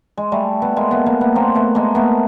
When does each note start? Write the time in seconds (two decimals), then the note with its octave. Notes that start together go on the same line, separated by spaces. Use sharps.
0.17 G#3
0.32 G3 A3
0.62 A3 B3
0.76 G#3 A#3
0.91 A3 B3
1.06 G#3 A#3
1.21 A3 B3
1.35 A#3 C4
1.55 A3 B3
1.75 G#3 A#3
1.95 A3 B3